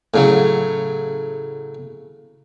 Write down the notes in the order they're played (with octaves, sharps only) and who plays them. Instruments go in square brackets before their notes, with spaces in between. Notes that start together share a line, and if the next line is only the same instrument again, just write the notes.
[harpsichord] A2 C#3 F#3